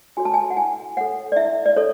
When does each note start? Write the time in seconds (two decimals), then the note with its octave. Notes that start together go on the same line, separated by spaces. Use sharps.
0.17 F#4 A4 C#5 G#5
0.25 A5
0.34 G#5
0.51 F#5
0.57 E4 G#5
0.97 A4 C#5 F#5
1.32 D5
1.36 E4 E5
1.66 D5
1.77 A4 C#5